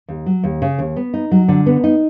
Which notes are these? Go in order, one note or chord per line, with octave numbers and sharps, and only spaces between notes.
D#2
F#3
D#2
C#3
D#2
B3
D#4
F#3
D3
B3
D#4